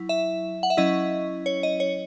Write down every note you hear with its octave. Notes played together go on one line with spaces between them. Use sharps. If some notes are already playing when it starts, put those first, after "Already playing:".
Already playing: F#3 E4
E5
F#5
E5
F#3 C#4 E4 D#5
C#5
D#5
C#5